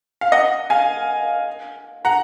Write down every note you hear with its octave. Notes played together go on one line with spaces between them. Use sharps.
F5
D#5 F#5
F5 G#5
F#5 A#5